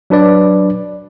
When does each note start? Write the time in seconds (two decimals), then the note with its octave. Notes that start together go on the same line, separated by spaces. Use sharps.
0.10 F#3 D4 B4 D5